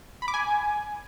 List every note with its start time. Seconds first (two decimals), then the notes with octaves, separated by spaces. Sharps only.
0.22 B5
0.28 D6
0.34 G#5